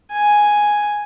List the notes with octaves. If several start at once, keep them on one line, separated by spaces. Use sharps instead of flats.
G#5